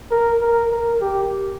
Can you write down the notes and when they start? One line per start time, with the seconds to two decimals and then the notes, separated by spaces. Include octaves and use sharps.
0.11 A#4
0.42 A#4
0.71 A#4
1.01 G4